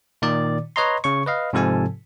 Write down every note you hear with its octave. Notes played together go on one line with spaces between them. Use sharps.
A#2 D#3 D5
B4 C#5 D#5 A#5 C6
C#3 C#5 C#6
B4 D#5 F5
G#2 C3 F3 A4 G#5 A5